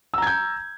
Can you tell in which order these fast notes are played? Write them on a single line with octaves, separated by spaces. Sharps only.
E6 A#5 G#6 G6